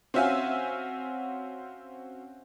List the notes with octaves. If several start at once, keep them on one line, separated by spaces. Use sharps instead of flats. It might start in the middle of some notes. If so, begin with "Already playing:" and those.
C4 C#4 F#4 E5 F5 G#5